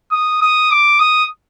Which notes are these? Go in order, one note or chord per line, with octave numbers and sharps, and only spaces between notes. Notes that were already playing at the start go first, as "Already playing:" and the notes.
D#6
D#6
D6
D#6